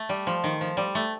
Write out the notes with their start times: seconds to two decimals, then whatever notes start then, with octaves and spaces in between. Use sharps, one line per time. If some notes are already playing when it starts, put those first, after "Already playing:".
Already playing: A3
0.09 G3
0.27 F3
0.44 D#3
0.61 F3
0.77 G3
0.95 A3